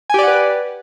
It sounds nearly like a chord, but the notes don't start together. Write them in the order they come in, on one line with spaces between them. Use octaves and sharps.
G#5 G4 D5 F#5 B4